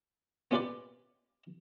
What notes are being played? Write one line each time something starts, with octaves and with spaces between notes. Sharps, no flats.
B3 C#4 F4 G4 B4 D5